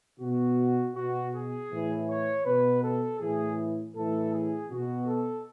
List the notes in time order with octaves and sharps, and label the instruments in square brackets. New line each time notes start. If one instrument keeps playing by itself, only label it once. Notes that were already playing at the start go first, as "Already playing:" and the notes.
[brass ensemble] B2 F#4
B2 F#4
G#4
A2 E3
C#5
B2 B4
A4
A2 E3 G#4
A2 E3 A4
G#4
B2 F#4
A4